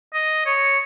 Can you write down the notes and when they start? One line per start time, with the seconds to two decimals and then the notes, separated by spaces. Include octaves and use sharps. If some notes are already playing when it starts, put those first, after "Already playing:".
0.14 D#5
0.46 C#5